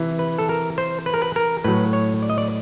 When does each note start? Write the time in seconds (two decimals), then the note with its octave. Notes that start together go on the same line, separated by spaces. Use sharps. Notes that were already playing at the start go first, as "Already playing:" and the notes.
Already playing: C3 E3
0.19 B4
0.38 A4
0.49 A#4
0.78 C5
1.06 B4
1.14 A#4
1.22 B4
1.36 A#4
1.64 A2 F#3 B4
1.93 C#5
2.22 D5
2.30 D#5
2.38 D5